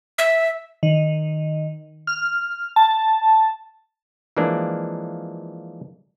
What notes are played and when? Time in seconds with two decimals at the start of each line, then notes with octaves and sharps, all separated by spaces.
0.18 E5
0.83 D#3
2.07 F6
2.76 A5
4.36 E3 F3 G#3 A#3 D4